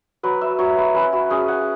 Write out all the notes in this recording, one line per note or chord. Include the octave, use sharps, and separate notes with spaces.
F#3 B4
E5
F#3 C#5
B4
C#4 B4
F#4
C#4 G#4
F#5